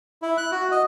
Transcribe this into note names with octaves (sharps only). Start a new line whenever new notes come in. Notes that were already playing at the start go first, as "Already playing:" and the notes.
E4
F#6
F#4
D#5